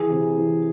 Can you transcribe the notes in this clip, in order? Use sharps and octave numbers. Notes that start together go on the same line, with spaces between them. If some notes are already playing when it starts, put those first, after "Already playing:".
Already playing: E3 G#4
C3
E3